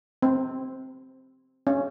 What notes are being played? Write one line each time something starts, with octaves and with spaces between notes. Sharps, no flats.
C4
C#4